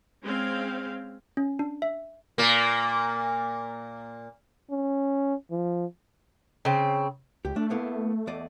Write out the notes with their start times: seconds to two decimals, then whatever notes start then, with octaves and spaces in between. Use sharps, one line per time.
0.24 G#3 C4 C#4 F5
1.37 C#4
1.59 D4
1.82 E5
2.38 A#2 A#3
4.70 C#4
5.51 F3
6.65 C#3 C4
7.45 C#2 G4
7.56 A3 D4
7.70 A#3 B3 E4
8.27 E2 D5 D#5